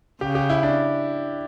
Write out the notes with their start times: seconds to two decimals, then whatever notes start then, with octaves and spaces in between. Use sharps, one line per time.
0.21 C#3 G4
0.35 G4
0.50 E4
0.63 D4